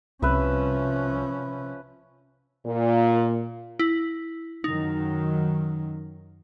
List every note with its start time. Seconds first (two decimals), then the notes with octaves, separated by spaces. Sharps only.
0.22 C2 C3 F3 C#4 B4 E5
2.66 A#2
3.79 E4
4.64 F#2 D#3 F#3 D#4